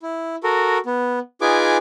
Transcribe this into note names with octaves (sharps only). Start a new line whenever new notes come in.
E4
F#4 A4 A#4
B3
D#4 F4 G#4 B4 G#5 D6